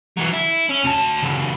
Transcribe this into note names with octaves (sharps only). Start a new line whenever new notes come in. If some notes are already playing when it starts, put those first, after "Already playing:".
E3 F#3
E4
C#4
D2 A5
C#2 F#2